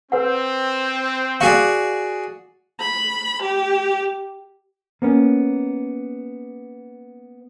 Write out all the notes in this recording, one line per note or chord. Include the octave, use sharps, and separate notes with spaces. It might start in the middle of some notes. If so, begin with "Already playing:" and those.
C4 B4 F#5
F#4 G#4 D5 F5
B5
G4
A#3 B3 C#4